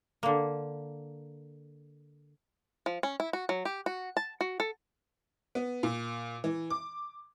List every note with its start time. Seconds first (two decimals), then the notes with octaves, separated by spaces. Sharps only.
0.23 D3 A#3
2.86 F3
3.03 C#4
3.20 E4
3.33 F#4
3.49 F#3
3.65 G4
3.86 F#4
4.17 A5
4.41 F#4
4.60 A4
5.55 B3
5.83 A#2
6.44 E3
6.70 D6